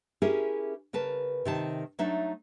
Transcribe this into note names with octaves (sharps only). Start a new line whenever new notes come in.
C#4 E4 G4 G#4 A#4 E5
C#3 A#4 B4 A5
C3 D#3 A5
F#3 A3 D4 D#4 E5